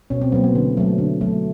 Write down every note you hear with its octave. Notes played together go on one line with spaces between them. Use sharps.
B2 C#4
C4
F#3 A#3 B3
B3
D3
F#3 A3
D3
F#3 A3